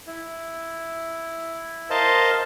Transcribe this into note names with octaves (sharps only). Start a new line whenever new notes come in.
E4
A#4 C5 D#5 F5 A5